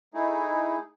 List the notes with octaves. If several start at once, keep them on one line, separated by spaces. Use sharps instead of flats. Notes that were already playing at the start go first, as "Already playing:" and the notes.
A3 D#4 E4 G#4